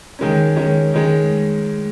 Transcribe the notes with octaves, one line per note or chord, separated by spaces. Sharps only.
D#3 G#3 C#4
D#3 G#3 C#4
D#3 G#3 C#4